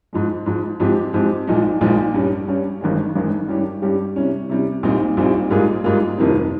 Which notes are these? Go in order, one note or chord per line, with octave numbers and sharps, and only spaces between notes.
G#2 F3 G#3
G#2 F3 G#3
G#2 F3 C4 G4
G#2 F3 C4 G4
A#1 A#2 F3 G#3 D#4
A#1 A#2 F3 G#3 D#4
G2 G3 C#4
G2 G3 C#4
G#1 G2 D#3 G#3
G#1 G2 D#3 G#3
G2 G3 C#4 G4
G2 G3 C#4 G4
C3 G3 C#4
C3 G3 C#4
A#1 A#2 G3 C4 D#4
A#1 A#2 G3 C4 D#4
G#2 G3 A#3 F4 G#4
G#2 G3 A#3 F4 G#4
F1 F2 D#3 G3 C4